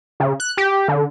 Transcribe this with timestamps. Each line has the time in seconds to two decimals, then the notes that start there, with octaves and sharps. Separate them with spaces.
0.20 C#3
0.40 F#6
0.58 G4
0.88 D3